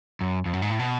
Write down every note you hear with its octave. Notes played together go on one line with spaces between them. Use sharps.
F#2
F2
F#2
G#2
A2
B2